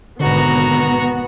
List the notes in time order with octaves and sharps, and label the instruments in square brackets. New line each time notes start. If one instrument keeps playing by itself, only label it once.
[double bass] G#1 B2 [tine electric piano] D3 [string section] B3 [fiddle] F#4 A#5